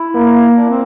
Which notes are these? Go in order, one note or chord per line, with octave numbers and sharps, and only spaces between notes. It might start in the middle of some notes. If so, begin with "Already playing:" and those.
Already playing: E4
A#3
D4
C4